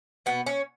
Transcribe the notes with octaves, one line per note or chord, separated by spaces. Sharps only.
B2 B3
C#4